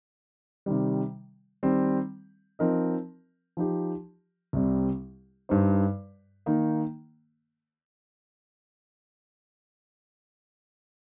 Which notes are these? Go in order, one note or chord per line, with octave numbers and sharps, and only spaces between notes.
C3 D#3 G3
D#3 G3 C4
F3 C4 D#4 A#4 D#5
F3 D#4 G4
C2 C3 G3 C4
G2 G3 D#4 C5
D#3 A#3 D#4